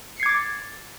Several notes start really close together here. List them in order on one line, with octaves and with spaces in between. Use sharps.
C#7 C7 G#6 D6 A6